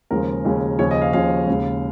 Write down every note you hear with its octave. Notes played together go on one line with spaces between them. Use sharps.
D#2 C#3 F3 G#3 C#4 A#4
D#2 C#3 F3 G#3 C#4
D#2 C#3 F3 C#4 C#5
D#5
F5
D#2 C#3 F3 C#4 F5
D#2 C#3 G#3